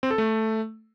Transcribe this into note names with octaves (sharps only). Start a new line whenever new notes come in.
C4
A4
A3